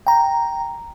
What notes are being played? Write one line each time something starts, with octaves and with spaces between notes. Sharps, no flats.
G5 A#5